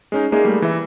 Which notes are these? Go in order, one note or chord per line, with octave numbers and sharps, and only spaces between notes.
G#3 C#4 D#4
G#3 A#3 D#4 G#4 D5 E5
G3 A3 A#3
E3 E5